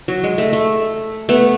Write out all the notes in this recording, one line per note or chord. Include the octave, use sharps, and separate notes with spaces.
F#3
G#3
A3
A3
A3 B3